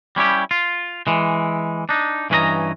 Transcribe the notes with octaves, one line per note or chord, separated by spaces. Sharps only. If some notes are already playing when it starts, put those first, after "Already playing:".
G3 C#4 E4 G4
F4
E3 G#3
D4 D#4
G2 E3 C#4 B4 D#5 A#5